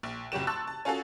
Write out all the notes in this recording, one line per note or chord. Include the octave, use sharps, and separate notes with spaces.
A#1
F#1 F2 F#3 F#4 G4 E7
A5 C6 C#6 E6 F#6 A6
A5
C#4 F4 F#4 G#4 A4